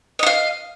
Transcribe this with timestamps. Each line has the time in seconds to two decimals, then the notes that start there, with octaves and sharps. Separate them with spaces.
0.19 D#5
0.23 F#5
0.26 F5